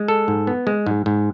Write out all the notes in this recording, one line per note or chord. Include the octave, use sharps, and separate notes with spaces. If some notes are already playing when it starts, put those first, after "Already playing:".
Already playing: G#3
A4
G#2
B3
G#3
G#2
G#2